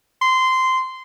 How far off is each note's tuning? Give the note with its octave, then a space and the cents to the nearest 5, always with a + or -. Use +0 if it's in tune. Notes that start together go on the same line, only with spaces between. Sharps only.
C6 -15